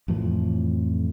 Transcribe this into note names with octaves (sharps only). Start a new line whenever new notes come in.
F2 A2 E3 F3